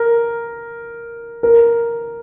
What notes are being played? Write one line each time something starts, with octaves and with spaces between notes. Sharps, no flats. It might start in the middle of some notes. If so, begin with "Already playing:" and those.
Already playing: A#4
A#4